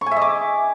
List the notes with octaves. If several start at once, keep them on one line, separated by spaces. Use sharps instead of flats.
C#6
G#5
E5
D#5
D6